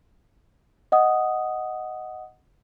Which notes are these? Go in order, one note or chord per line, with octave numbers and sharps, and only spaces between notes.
D#5 F#5 D#6